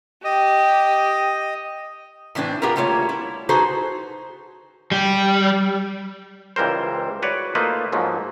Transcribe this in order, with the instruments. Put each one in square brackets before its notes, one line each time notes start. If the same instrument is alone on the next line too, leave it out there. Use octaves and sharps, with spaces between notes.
[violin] G4 [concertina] D#5
[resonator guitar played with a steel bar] A2 E3 C4 D4 B4
B3 F4 G4 G#4 A#4 A#5
G3 A3 A#3 F4 C5 C#5
E4
D#4 F#4 G#4 A4 B4 C5
[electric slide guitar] G3
[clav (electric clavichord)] C#2 E3 G3 A#4 C5
F#4 B4 C#5 D5
A3 A#3 D#4 F4 B4 C5
G#2 F3 F#3 A#3